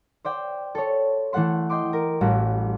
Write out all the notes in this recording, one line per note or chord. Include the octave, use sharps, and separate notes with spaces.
C5 D5 G5
A4 C#5
E3 A3 A4 F#5 C6
D#5 G5 C6 D6
A#4
A1 G3 A3 E4 F#4